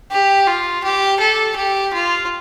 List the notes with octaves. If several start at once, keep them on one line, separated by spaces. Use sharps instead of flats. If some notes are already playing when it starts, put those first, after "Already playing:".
G4
F4
G4
A4
G4
F4